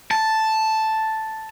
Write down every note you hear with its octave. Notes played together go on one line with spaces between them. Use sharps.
A5